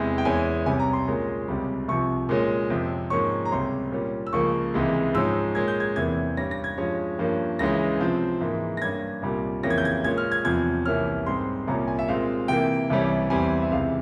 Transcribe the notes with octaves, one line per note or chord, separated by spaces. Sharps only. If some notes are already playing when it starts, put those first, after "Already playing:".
Already playing: E2 C3 E3 G#3
G5
E2 E3 G#3 C#4 G#5
C2 C3 G3 C#4 G#5
A#5
C6
A#2 G#3 C#4
C#2 C3 G3 C#4
C2 C3 F3 C#6
A#2 G#3 C#4
F2 C3 F3
G#2 F3 A#3 C#4 C#6
A#5
C#2 C3 G3 C#4 C6
A#2 G3 C#4
E6
C#2 C#3 F3 A#3 C#6
C#2 C3 E3 G#3
G#2 F3 G#3 C#4 E6
A#2 G#3 C#4 G#6
G6
G#6
E2 C3 E3 A#3 G#6
G2 G3 C#4 A#6
A#6
G#6
G2 F3 G#3 C#4
G2 F3 A#3 C#4
C#2 C#3 E3 G#3 C#4 A#6
C3 F3 C4
G#2 E3 A#3
A#6
G2 G3 A#3 C#4 G#6
C2 A#2 G3
F2 C#3 E3 A#3 C#4 A#6
G#6
G6
G#6
A#2 G#3 C#4 G#6
F6
G#6
E2 C3 F3 G#6
C2 C3 E3 A#3 C#4 F6
G#2 G3 C4 C6
C2 A#2 G3 A#3 C#4 A#5
G#5
E5
A#2 G#3 C4 F5
C3 E3 A#3 G5
C2 C3 E3 G3 C#4
E2 E3 G3 C4 G#5
E5
C#2 C3 E3 F5